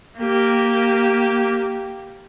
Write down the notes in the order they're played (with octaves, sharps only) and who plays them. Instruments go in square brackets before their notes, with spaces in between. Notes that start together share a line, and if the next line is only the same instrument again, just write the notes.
[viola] A#3 G4